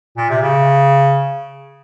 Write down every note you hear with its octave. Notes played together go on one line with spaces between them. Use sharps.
A#2
C3
C#3